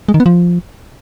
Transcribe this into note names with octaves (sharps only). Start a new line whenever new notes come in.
G#3
D#3
B3
F3